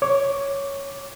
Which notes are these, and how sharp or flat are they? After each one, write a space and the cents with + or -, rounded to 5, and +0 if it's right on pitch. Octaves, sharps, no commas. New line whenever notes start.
C#5 +0 D6 -10